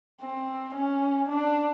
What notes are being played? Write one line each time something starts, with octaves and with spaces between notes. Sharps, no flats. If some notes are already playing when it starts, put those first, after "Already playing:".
C4
C#4
D4